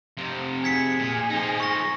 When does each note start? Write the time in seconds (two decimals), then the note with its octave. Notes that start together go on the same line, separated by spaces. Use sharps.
0.17 F2 C3
0.64 G#4 G#6 B6 C#7
0.99 A#2
1.30 F3 D#4
1.60 C#6 A#6